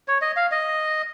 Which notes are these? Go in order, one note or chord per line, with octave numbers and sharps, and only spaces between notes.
C#5
D#5
F5
D#5